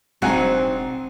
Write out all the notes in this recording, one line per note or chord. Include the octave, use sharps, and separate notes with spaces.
E1 F#3 C4 D4 D#4 C5 F#5 G#5